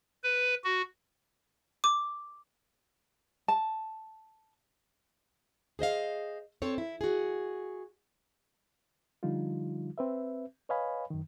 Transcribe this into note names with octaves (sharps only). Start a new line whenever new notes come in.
B4
F#4
D6
A5
G#4 C5 D#5 F5
C4 A4 C5 C#5
E4
F#4 G#4
D3 F3 G3 D#4 F4
C4 B4 E5
B4 C#5 D#5 F5 G#5 B5
F#2 D#3